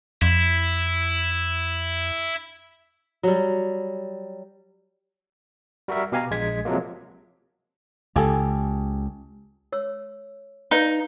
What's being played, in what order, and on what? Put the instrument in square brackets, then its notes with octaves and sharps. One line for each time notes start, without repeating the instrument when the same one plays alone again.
[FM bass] F2 [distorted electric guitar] E4
[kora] F#3 G3
[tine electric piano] G3 F#4 A#4 E5
B2 G4 F5 G#5 A#5
A#1 G#3 G#6 B6
C3 F3 F#3 G#3 A#3
[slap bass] C#2 [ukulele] G4 A4 G#5
[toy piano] C#5 E6
[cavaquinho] D#4 [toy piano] B4 D5 F5